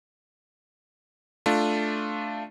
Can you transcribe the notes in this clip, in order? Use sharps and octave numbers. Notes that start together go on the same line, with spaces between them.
A3 D4 F4